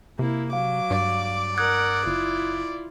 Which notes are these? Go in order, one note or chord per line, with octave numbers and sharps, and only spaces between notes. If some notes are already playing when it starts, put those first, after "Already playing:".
C3 A#3 E4
F#3 F5 D6
G2 D5
A#4 F#5 D#6 F#6 G#6
F#1 E4 F4